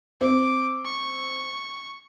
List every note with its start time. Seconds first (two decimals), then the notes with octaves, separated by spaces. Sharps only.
0.21 C4 D6
0.85 C#6